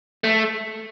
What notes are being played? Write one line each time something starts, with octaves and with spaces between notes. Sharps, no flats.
A3